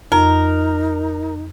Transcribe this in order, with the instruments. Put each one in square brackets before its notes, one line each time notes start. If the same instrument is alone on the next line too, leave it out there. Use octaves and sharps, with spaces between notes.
[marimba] F2 [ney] D#4 [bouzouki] A#4